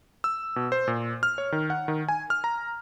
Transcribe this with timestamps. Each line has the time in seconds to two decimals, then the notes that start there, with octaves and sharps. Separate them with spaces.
0.24 E6
0.56 B2
0.72 C5
0.88 A#2
1.23 F6
1.38 C#5
1.52 D#3
1.70 F#5
1.88 D#3
2.08 G#5
2.30 F6
2.44 A#5